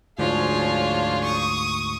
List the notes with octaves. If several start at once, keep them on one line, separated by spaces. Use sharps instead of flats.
D2 G#2 F3 D4 F4 G#4 C#5
C#6 D#6